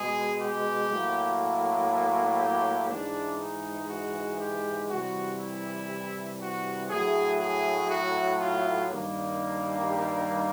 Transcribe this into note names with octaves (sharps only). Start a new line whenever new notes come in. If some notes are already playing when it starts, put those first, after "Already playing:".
Already playing: B2 G#3 G#4
G4
A2 F#3 A#3
G4
G#2 E3 G#3 D4
D#4
F#4
G4
C3 E3 G3 F#4
E4
F#4
A2 F#3 A3 G#4
G#4
F#4
F4
G2 D#3 G3 A#3
G4